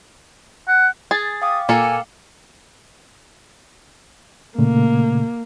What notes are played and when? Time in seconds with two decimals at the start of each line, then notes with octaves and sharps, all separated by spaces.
0.68 F#5
1.11 G#4 A6
1.42 F5 G5 D6 D#6
1.69 A#2 A#3 A4 G#5 C#7
4.59 A#2 C#3 A3 A#3